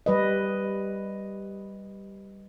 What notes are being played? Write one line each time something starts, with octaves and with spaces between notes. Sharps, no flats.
G3 B4 D#5